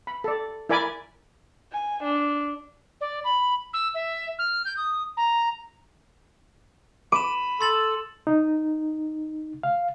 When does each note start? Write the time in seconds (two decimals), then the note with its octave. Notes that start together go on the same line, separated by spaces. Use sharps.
0.07 B5
0.24 A4 D5
0.69 E4 A#4 D5 G#5 B5 D6
1.72 G#5
2.04 D4
3.01 D5
3.24 B5
3.73 E6
3.95 E5
4.39 F6
4.65 G6
4.77 D#6
5.17 A#5
7.12 B5 D6 D#7 E7
7.61 A4 C6 A6 F#7
8.27 D#4
9.63 F5